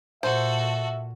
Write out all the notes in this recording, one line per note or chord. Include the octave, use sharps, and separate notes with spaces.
A#2 F#4 A4 C5 E5